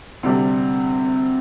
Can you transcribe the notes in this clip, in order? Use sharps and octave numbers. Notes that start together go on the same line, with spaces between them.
D2 C3 G3 D4 G4